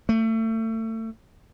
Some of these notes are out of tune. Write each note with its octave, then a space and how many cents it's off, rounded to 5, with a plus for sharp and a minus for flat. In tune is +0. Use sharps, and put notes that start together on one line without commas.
A3 +30